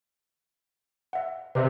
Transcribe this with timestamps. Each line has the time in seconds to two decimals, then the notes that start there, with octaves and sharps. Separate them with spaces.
1.13 E5 F#5
1.55 C3 B4 D#5 E5